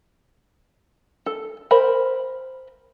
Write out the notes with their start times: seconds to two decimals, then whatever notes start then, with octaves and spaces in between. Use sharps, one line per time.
1.26 A4
1.71 A#4 C5 B5